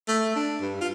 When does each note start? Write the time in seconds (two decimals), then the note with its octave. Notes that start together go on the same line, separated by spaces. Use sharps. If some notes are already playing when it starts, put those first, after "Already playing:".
0.08 A3
0.36 D4
0.61 G2
0.81 F4